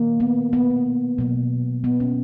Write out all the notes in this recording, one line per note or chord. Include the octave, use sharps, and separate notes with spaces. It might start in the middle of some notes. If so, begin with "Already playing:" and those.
Already playing: D#3 A#3
B3
B3
B2 F#3 A#3
B3
C#4